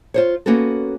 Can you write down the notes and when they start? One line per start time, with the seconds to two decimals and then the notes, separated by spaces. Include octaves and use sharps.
0.14 F4 C5 C#5
0.46 A#3 B3 C#4 F#4 A4